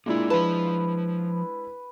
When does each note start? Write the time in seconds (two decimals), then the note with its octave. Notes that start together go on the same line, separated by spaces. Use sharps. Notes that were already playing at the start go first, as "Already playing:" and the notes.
0.06 G#3 A#3 D4 E4 F4
0.30 F3 B4 A5